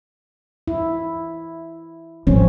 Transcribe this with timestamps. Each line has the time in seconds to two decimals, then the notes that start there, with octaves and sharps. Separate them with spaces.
0.68 E4
2.27 G#1 F3 C4 C#4